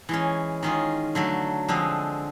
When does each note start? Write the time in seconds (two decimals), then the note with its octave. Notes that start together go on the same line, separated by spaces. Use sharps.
0.09 E3 G#3 C#4
0.63 D#3 G#3 C#4 F4
1.15 D3 F#3 A3
1.68 D3 F3 G#3 C4